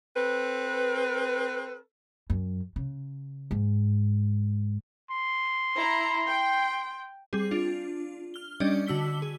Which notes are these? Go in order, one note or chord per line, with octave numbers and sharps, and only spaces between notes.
C4 A4 B4
F#2
C#3
G#2
C6
E4 A#5
G5
G3 C4 G#4
D4 F4
F6 G7
G3 C#4 D4 D5 D#5
D3 F#4 E6 B6 G7
G#4